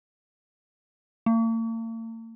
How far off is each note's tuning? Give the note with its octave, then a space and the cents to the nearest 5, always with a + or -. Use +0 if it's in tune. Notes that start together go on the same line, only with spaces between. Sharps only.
A#3 -45